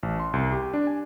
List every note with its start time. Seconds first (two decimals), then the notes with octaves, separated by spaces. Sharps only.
0.03 A1
0.20 C6
0.33 C2
0.52 G4
0.74 D4
0.87 G#5